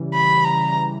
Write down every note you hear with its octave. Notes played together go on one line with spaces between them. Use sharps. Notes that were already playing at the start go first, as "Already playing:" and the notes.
Already playing: C#3 E3 G3
B5
A#5